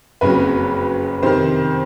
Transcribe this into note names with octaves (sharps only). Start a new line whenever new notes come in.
F#1 F2 C#3 F#3 B4
F2 C3 D#3 C5